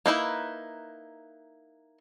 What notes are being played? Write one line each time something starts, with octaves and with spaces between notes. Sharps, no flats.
A#3 D#4 E4 B4